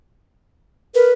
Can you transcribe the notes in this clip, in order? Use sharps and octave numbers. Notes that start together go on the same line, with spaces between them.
A#4 B4